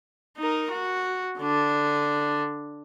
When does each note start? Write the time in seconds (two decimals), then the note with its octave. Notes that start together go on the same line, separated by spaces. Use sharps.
0.38 D#4 A#4
0.71 F#4
1.39 D3 D4